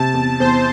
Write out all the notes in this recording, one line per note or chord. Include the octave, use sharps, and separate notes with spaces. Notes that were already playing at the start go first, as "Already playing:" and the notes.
Already playing: C3 A5
E2
E2 C5